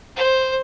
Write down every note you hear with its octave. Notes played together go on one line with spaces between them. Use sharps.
C5